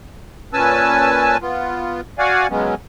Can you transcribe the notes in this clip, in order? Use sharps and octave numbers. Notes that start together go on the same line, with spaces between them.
A#2 C#4 B4 G#5 A5 E6
B3 F4
F#4 D5 F5 F#5 G#5
C#3 F#3 G#3 B3 C#4